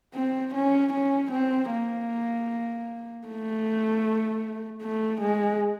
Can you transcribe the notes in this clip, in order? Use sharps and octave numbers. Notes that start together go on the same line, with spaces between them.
C4
C#4
C#4
C4
A#3
A3
A3
G#3